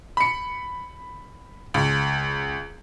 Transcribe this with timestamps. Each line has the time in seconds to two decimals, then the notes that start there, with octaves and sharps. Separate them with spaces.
0.17 B5 C#7
1.74 C#2